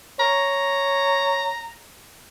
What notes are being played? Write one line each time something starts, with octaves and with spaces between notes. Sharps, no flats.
C#5 A#5